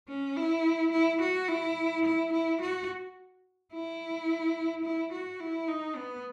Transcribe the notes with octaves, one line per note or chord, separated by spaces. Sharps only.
C#4
E4
E4
F#4
E4
E4
E4
F#4
E4
E4
F#4
E4
D#4
B3